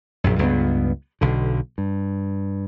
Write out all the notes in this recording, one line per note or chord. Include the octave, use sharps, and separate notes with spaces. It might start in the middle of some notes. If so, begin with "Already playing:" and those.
A#1 F#2
C#2 G2 B3
B1 D3
G2